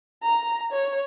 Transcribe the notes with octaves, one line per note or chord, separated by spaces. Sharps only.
A#5
C#5